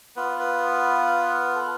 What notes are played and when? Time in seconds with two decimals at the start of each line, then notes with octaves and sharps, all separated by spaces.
0.16 B3 F4 B4
0.39 B4
1.55 A4